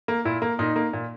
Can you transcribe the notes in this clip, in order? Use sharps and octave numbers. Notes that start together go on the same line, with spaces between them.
A#3
A#2 E4
A#3
A#2 D#4
A#3
A#2